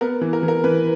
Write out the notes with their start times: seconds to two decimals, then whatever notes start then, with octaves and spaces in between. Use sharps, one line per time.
0.01 B3 A#4
0.21 E3
0.33 A#4
0.43 E3
0.48 A#4
0.64 E3 B4